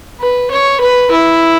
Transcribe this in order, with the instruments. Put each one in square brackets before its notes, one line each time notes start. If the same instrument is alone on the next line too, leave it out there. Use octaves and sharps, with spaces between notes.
[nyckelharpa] B4
C#5
B4
E4